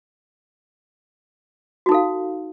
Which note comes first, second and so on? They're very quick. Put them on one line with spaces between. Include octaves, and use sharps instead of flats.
F#4 D#4 A4 F5